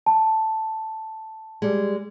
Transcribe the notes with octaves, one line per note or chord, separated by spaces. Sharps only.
A5
G3 G#3